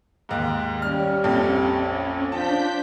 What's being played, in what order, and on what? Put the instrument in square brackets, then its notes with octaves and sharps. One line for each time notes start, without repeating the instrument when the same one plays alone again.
[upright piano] D#2 G#2
[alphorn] G3 [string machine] C#4 [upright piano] F6
[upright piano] A#1 F2
[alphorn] F3 [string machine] D4 G6 B6 [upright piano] A5